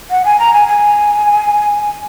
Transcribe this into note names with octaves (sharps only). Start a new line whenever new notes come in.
F#5
G#5
A#5
G#5
G#5